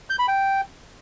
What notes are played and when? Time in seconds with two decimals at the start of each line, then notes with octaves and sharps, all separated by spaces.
0.10 G6
0.19 B5
0.28 G5